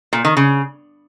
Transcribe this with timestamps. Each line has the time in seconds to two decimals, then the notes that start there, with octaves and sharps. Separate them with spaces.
0.13 A#2
0.25 D#3
0.37 C#3